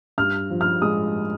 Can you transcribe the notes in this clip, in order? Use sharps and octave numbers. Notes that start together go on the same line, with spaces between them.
G2 F6
F3
F6
G#3 D#6